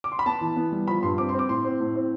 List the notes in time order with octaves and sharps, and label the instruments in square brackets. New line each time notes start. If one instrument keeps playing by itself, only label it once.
[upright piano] D6
C6
B5
B3 A5
E3
B3
G3
F3 B5
G2 C6
C4 D6
C6
C4
D6
A2 C6
C4
A2
C4